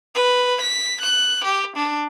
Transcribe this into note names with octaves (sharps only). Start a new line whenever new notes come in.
B4
B6
F#6
G4
D4